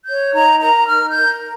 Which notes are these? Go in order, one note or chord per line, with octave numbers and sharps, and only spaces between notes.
C#5 G6
D#4 A#5
A#4 A#5
D#4 F6
G6
A#4